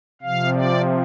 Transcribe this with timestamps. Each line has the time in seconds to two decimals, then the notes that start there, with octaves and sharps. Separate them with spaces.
0.22 C3 F3 F5
0.54 D5